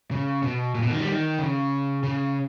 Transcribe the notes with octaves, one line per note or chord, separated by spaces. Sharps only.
C#3
B2
A#2
B2
D#3
G3
D#3
C#3
C#3